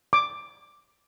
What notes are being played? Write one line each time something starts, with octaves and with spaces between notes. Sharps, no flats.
D6